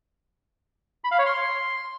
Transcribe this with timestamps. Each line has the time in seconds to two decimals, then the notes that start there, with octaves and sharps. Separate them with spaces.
1.04 B5
1.11 F5
1.19 C#5
1.26 C6